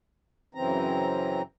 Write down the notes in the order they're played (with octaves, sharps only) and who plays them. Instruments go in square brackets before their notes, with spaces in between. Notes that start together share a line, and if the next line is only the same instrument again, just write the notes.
[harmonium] F#2 C#3 E3 C4 A#5